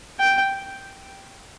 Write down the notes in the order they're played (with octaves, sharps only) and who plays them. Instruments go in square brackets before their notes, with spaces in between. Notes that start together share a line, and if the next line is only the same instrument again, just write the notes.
[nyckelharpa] G5